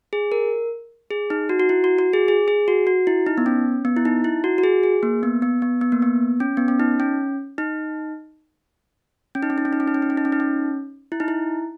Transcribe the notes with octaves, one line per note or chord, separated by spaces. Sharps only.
G#4
A#4
G#4
D#4
F#4
F#4
E4
F#4
F#4
G#4
G#4
G#4
F#4
F#4
E4
D#4
B3
C#4
B3
E4
D#4
E4
F#4
F#4
G#4
G#4
A#3
B3
B3
B3
B3
A#3
B3
C#4
B3
C#4
D#4
C#4
D#4
C#4
D#4
C#4
D#4
C#4
D#4
C#4
D#4
C#4
D#4
C#4
D#4
C#4
D#4
C#4
E4
D#4
E4